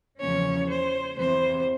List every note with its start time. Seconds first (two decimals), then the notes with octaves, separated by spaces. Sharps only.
0.19 E2 C#3 F3 A#3 C#4 C#5
0.68 C5
1.17 E2 C3 E3 C5